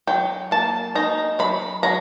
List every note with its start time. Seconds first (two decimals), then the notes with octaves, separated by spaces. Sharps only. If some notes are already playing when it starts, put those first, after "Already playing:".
0.07 F#3 G5
0.51 A#3 A5
0.95 D#4 A#5
1.39 F#3 B5
1.83 F#3 A#5